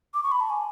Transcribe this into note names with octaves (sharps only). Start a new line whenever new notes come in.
D6
C#6
B5
A5
G#5